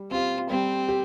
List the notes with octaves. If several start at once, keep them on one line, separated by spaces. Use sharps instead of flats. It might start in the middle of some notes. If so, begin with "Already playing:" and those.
Already playing: G3
C4 F4 G4
G3 C4
G4